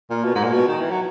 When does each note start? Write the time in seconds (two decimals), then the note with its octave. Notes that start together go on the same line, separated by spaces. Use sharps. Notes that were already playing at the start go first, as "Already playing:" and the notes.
0.10 A#2
0.24 B2
0.35 G#2
0.43 A#2
0.52 B2
0.67 D#3
0.80 E3
0.90 F#3